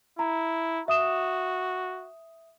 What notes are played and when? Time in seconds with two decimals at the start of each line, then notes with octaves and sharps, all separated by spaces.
0.19 E4 A#5
0.88 F#4 E5 D#6 E7